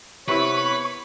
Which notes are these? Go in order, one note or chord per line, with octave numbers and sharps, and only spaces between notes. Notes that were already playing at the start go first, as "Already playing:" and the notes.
C3 B3 E4 B4 C#5 C#6